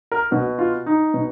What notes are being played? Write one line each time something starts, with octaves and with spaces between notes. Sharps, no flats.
A#4
B2 F#4
F4
D#4
B2